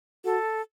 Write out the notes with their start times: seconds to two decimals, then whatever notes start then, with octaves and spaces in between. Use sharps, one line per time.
0.25 F#4 A4